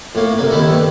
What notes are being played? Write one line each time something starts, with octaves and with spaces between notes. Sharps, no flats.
A2 A#3
C2 A#3
D#2 D#3 E4 A4
G2